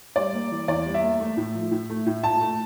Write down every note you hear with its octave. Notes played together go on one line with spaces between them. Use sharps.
G3 D5
A#3
E3
E2 D5
G3
E5
A#3
A3
A2
F3
A2
A3
A2
A#2 A5
A3